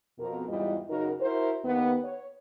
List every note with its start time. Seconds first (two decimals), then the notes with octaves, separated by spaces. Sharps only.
0.19 F2 B2 A#4
0.48 E2 G#2 E3 G3 F4 D#5
0.90 F#2 C#3 D#4 F#4 A#4
1.20 E4 F#4 A#4 C5
1.64 D#2 B3 B4
2.04 C#5